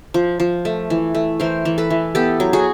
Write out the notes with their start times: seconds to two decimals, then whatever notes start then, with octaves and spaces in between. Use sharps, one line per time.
0.14 F3
0.40 F3
0.65 A3
0.90 E3
1.15 A3
1.40 E3 A#4 C5
1.65 E3
1.78 A4 B4
1.90 E3
2.15 B3 G4 A4
2.40 F#3
2.53 F#4 G#4